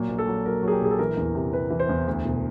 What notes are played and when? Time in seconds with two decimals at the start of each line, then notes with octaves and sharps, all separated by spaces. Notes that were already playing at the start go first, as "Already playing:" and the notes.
Already playing: A#2 F#3
0.09 A#1
0.19 A4
0.27 F#3
0.45 F#3 A#4
0.63 F#3 G#4
0.72 G4
0.81 A#1 G#4
0.91 A4
0.99 E3 A#4
1.17 E2
1.35 C3
1.53 C3 B4
1.70 E3
1.80 C5
1.89 E2
2.07 D2
2.25 E1